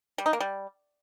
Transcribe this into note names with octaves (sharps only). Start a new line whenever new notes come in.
G3
D#4
A#3
G3